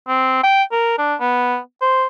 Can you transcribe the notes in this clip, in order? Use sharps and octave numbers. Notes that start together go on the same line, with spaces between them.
C4
G5
A#4
D4
B3
C5